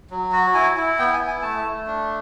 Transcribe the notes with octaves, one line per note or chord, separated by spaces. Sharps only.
F#3
F#4
E4 G#5
E4
B3 G5
G#5
E4
G#5
A3 A5
A3
D4